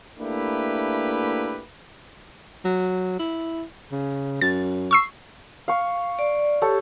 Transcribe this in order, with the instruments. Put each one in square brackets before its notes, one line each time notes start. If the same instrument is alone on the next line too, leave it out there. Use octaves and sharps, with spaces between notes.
[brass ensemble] A3 A#3 D4 E4 G4 B4
[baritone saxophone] F#3
E4
C#3
[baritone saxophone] F#2 [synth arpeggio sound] A6
[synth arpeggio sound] C#6 E6 C7
[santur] F5 C#6
[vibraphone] D5
[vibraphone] G4 [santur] A4 C#5 A5